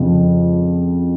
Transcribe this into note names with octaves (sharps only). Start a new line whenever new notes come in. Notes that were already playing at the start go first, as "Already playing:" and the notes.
Already playing: F2 C#3 F3